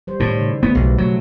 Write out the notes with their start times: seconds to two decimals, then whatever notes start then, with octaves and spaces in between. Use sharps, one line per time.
0.07 G3 C5
0.20 A2 D#3 E4
0.37 C#3
0.63 A3 B3 E4
0.75 B1
0.98 B2 F#3 A3